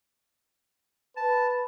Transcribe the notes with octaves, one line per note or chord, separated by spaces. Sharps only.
B4 A5